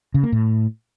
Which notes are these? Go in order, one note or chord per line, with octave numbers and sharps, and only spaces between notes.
C#3
A#3
A2